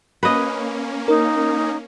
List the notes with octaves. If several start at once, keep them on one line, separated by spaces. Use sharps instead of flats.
A#3 C#4 B4 D#5
D#4 A#4